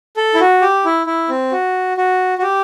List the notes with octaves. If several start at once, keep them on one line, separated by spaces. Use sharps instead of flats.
A4
E4
F#4
G4
E4
E4
C4
F#4
F#4
F#4
G4